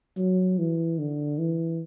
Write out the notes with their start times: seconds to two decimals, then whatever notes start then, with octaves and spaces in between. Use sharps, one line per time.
0.17 F#3
0.58 E3
0.99 D3
1.38 E3